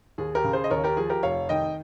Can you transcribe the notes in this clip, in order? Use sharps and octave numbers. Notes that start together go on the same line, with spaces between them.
D#2 G#4
G4 A#4
C#3
G#4 C5
D#5
D#2 A#4 C#5
G4 A#4
F3 G#4
G4 A#4
F1 C#5 F5
D#3 D#5 G5